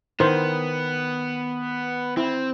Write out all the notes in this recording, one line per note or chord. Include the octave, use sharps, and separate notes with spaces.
D#3 B3 E4 C5
C4 E4